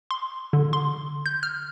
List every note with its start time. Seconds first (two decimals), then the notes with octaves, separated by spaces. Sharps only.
0.11 C6
0.53 D3
0.73 C6
1.26 G6
1.43 F6